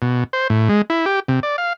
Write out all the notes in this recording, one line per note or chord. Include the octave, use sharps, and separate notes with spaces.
B2
C5
A2
G#3
E4
G4
C3
D5
F5